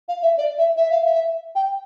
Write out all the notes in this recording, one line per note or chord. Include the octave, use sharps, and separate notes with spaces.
F5
E5
D5
E5
E5
F5
E5
G5